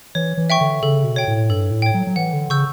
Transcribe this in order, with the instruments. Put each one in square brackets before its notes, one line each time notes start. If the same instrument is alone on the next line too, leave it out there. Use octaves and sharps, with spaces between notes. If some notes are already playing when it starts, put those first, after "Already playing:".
[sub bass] E3 [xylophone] C#5
[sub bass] E3
[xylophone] E5 G5 C#6
[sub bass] D3
[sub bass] C#3 [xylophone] A4
[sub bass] B2
[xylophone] C#5 G5
[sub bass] A2
[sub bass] G2 [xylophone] A4
[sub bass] A2
[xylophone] C#5 G5
[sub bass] F#3
F#3
[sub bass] E3 [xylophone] F#5
[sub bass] D3
[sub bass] C#3 [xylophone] C#6 E6 G6